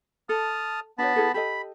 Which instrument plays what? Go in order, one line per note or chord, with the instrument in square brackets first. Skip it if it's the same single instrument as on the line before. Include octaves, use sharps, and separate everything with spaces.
[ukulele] A4 [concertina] A5 D#6 F6
[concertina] B3 A5 B5 [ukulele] D4 F#4 C#5
[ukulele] E4 G#4 A4
[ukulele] G4 A4 D#5 [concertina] B5